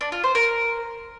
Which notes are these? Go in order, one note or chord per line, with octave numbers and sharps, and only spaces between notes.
D4
F4
C5
A#4